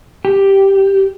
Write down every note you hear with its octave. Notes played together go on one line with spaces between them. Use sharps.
G4